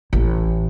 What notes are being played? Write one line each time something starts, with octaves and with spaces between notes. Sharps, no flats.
A1